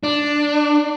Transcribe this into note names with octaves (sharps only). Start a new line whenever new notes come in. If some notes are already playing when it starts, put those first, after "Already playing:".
D4